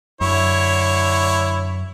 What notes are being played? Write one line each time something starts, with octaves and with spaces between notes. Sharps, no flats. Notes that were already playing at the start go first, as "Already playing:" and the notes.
F#2 D3 E4 C#5